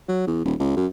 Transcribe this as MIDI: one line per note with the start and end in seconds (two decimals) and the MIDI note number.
0.09 0.25 54
0.27 0.41 40
0.45 0.54 27
0.60 0.74 37
0.76 0.87 42